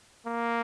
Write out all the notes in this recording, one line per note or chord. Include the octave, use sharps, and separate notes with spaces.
A#3